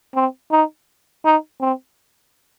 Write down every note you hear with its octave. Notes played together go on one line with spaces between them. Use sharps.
C4
D#4
D#4
C4